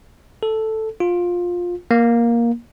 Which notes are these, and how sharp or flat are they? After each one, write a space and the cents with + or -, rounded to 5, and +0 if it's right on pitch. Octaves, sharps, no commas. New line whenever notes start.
A4 +0
F4 +15
A#3 +10